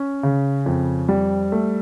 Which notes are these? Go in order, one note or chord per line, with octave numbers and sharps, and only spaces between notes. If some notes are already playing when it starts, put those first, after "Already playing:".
Already playing: C#4
C#3
F2
G3
A3